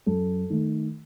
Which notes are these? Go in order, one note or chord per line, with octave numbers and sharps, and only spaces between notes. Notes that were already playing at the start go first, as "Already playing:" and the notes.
F#2 A4
D#3 A3